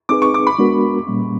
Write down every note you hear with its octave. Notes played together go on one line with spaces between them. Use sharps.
C4 D#4 G#4 B4 D6
C#6
D6
B5
G#3 B3 D4 F#4 A#4
A#2 G3 A#3 C#4